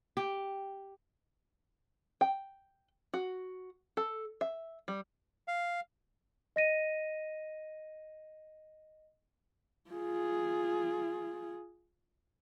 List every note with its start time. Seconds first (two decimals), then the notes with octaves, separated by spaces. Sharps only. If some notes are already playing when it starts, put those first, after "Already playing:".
0.17 G4
2.21 G5
3.14 F#4
3.97 A4
4.41 E5
4.88 G3
5.48 F5
6.56 D#5 A#6 D#7
9.90 F4 G#4